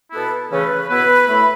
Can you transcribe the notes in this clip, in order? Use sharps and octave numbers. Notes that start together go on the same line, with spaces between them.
B2 B3 E4 A4
C#3 E3 A3 C#4 B4
B2 B3 E4 B4
A2 A3 E4 B5